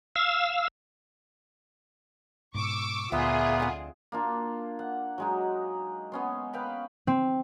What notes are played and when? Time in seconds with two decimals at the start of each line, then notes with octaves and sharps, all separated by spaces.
0.16 F5 E6
2.55 G#2 B2 C#6 D6 E6
3.12 D2 A#2 B3 F4 G#4 E5
3.60 F2 D3
4.12 A#3 D4 F4
4.79 F#5
5.18 F#3 G#3 D#4
6.12 B3 C#4 C6
6.53 B4 F5 G5 B5
7.07 C4